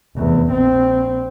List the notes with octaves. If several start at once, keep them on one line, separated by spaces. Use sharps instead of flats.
F1 E2
A#1 C4